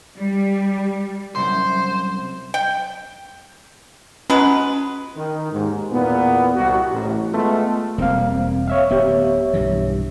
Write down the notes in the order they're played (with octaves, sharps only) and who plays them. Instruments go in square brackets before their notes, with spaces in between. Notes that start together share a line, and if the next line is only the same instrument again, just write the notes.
[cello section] G3
[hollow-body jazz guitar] C2 F#2 [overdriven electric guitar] C5
[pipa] G5
[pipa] F#3 G#3 B4 [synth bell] C#4
[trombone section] D#3
D#2 G#2
E2 A#2 B3
C2 F#4
A1
G#3 A3 B3 F4
[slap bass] E1 G3 [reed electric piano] A#3 C4 F5
[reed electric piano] C#5 E5 F5
[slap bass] D1 B3 [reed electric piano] G4 C#5 E5
[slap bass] B1 G2 E3